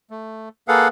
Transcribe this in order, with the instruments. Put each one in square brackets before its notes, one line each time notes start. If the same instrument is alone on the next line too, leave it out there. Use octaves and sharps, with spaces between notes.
[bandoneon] A3
A#3 G#4 A4 B4 F5 F#5